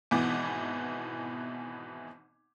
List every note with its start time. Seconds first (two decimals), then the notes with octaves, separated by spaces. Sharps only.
0.11 G#1 B2 E3 B3 D6